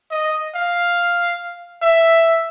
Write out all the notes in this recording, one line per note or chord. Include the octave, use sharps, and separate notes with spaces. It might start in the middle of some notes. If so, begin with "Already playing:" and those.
D#5
F5
E5